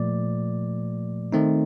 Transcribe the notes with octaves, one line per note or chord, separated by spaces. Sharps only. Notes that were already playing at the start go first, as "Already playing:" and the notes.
Already playing: A#2 F3 A3 D5
D#3 A3 C4 D#4